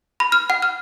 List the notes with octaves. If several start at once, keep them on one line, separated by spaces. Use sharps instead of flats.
B5
F6
F#5
F6